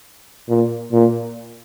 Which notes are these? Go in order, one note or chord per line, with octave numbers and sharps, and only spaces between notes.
A#2
A#2